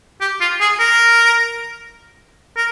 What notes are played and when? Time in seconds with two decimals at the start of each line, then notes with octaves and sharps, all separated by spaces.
0.21 G4
0.41 F4
0.60 G#4
0.79 A#4
2.57 A#4